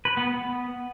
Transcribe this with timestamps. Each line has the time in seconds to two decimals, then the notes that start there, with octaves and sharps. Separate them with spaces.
0.05 B4
0.17 B3
0.29 B3